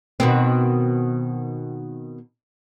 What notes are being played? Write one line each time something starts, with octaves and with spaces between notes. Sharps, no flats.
B2 D#3 C4